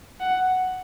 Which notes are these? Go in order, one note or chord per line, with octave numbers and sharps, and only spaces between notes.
F#5